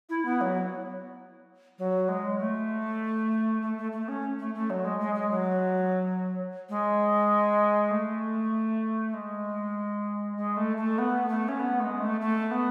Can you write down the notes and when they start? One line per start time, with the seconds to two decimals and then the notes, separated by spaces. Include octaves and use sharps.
0.09 E4
0.25 B3
0.41 F#3
1.78 F#3
2.08 G#3
2.39 A3
3.62 A3
3.78 A3
3.92 A3
4.08 C#4
4.39 A3
4.54 A3
4.70 F#3
4.84 G#3
5.00 G#3
5.15 G#3
5.31 F#3
6.69 G#3
7.91 A3
9.14 G#3
10.37 G#3
10.57 A3
10.77 A3
10.98 B3
11.28 A3
11.48 C#4
11.59 B3
11.80 A3
11.84 G#3
11.99 A3
12.21 A3
12.51 B3